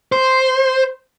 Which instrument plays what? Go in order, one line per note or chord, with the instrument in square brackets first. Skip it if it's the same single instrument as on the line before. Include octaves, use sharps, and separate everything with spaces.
[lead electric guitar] C5